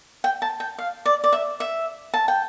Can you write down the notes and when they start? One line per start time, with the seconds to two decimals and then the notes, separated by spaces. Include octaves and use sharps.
0.24 G5
0.42 A5
0.60 G5
0.78 F5
1.06 D5
1.24 D5
1.33 E5
1.60 E5
2.14 A5
2.28 G5